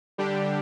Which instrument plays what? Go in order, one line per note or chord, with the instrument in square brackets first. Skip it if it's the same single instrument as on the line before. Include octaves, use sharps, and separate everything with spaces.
[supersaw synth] D3 G3 D4 G4